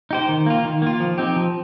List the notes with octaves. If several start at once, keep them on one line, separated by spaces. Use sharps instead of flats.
D#4 G4 C5
D#3
A#3 F4
D#3
A#3 F4
F3
C4 D#4 G4
F3